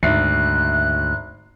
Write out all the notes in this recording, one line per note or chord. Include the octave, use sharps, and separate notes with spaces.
G#1 D2 E5 F#6 C7